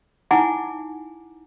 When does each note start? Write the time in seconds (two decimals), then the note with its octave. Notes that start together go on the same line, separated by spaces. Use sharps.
0.31 D#4 E4 F#5 G#5 D6